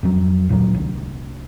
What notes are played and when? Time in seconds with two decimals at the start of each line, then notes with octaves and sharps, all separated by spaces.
0.03 F2 F#3
0.49 D2 A#2 F3 F#3
0.75 C2 D#3